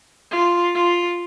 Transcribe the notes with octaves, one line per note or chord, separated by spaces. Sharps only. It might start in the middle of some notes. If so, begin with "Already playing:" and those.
F4
F4